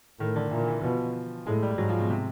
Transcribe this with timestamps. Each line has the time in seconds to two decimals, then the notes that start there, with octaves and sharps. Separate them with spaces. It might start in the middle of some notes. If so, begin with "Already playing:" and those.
0.20 A2 D#3
0.36 D3
0.51 A#2 E3
0.67 E3
0.83 B2 F3
1.47 A2 G#3
1.62 G3
1.78 G#2 F#3
1.89 F3
1.99 B2
2.10 C3